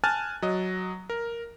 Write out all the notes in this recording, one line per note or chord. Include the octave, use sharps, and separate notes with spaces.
G#5 A5 F6 F#6 A6
F#3 D#5
A#4